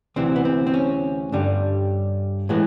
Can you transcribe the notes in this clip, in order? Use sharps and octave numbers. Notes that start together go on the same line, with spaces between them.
D2 C3 E3 C4
B3
C4
C4
C#4
G2 D3 G3
A2 E3 G#3